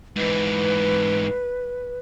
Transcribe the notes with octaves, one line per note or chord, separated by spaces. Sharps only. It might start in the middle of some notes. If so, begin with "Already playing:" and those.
G#2 E3 B4